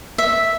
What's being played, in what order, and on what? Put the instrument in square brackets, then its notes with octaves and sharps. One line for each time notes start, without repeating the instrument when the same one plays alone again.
[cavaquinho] E5